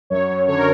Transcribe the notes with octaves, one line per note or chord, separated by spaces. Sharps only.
F#2 C#5
F#2
D3 C#5
A#4